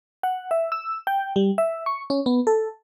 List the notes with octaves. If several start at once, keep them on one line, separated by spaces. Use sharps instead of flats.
F#5
E5
E6
G5
G3
E5
C#6
C#4
B3
A4